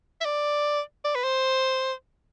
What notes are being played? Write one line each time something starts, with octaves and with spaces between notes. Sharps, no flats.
E5
D5
D5
B4
C5